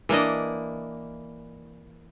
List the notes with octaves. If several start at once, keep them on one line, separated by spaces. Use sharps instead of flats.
E3 A#3 D4 D#5